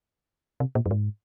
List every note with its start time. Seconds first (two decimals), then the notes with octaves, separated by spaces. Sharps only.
0.60 C3
0.75 A#2
0.86 F#2
0.91 G#2